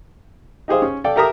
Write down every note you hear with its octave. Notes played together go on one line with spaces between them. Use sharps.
D#4 G4 G#4 C5 F5
C#4
A4 D5 F5 G5
G4 A4 A#4 E5 A#5 D#6